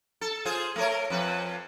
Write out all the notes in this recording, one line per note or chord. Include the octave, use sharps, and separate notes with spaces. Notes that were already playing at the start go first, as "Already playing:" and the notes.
A4
F4 G#4 C5
A3 A#4 C#5
F2 B4